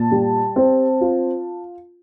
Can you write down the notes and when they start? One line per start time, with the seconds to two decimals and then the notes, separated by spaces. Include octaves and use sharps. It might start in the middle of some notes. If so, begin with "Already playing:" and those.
Already playing: A#2 A5
0.11 G3
0.56 C4
1.01 F4